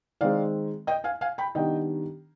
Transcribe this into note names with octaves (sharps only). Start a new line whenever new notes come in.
D#3 G#3 C4 D5 F5
D#5 G5
F5 G#5
F5 G#5
G5 B5
D#3 G3 B3 D4 D#5 G5